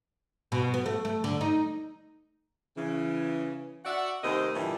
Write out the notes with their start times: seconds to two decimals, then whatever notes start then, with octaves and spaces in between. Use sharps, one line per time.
0.52 B2
0.74 B3
0.86 A3
1.05 A3
1.24 D3
1.41 D#4
2.77 C#3 E3
3.85 F#4 D5 E5 F#5
4.24 D#2 C3 A3 A#4 C5 D#5
4.55 G2 A#2 D3 E3